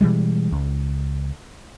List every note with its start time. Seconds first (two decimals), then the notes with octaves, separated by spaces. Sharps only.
0.01 B2 E3 G3 G#3
0.52 C#2